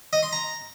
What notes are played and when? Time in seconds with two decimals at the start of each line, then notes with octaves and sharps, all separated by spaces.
0.13 D#5
0.23 C6
0.33 A#5